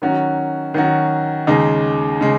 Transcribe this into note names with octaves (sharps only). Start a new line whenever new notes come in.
D#3 F#3 C#4 F#4
D#3 F#3 C#4 F#4
D#2 C#3 G#3 D#4
C#3 G#3